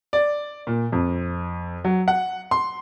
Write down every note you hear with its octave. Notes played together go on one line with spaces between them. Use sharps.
D5
A#2
F2
F#3
F#5
C6